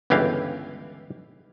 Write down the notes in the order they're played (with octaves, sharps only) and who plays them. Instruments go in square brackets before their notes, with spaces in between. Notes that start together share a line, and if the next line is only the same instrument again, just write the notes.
[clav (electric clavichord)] G1 C#2 E3 G4 F5